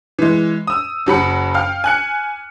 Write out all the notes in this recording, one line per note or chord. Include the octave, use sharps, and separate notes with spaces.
E3 G#3
D#6 E6
F#1 F#3 B5 C#7
F5 G5 F6
G#5 F#6 C#7